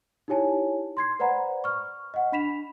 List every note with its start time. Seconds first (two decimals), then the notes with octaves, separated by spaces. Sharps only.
0.28 D#4 E4 G4 C#5 G#5 A5
0.97 C6 G#6 C7
1.19 B4 C5 D5 F#5 A#5 B5
1.64 C#6 F6
2.14 D#5 F#5
2.32 D4 B5 B6 E7 F7